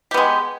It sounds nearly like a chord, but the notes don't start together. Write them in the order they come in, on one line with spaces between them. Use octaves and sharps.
G4 B3 G#3